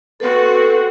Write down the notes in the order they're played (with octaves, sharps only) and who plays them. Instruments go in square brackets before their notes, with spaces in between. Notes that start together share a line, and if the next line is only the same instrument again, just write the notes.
[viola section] C4 F#4 [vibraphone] A4 [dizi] B4